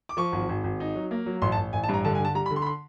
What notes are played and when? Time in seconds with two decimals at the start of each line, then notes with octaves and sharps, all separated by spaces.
0.09 D6
0.17 F3 C#6
0.32 G#1
0.49 G#1
0.64 G#1
0.80 D#4
0.95 F#3
1.11 A#3
1.26 F#3
1.42 A1 C6
1.52 A5
1.57 A1
1.73 A1 G#5
1.83 A5
1.89 G2 A#5
2.05 D3 A5
2.15 G#5
2.19 D3
2.25 A5
2.35 G3 A#5
2.46 B5
2.50 D3
2.56 C6
2.62 B5
2.66 C6